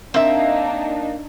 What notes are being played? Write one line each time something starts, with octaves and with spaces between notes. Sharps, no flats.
A#3 C4 D4 D#4 E5